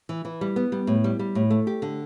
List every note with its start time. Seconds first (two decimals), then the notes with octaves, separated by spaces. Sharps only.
0.09 E3
0.25 E3
0.41 G3
0.56 B3
0.72 G3
0.87 A2
1.04 G3
1.19 G3
1.35 A2
1.50 A3
1.67 G4
1.82 D3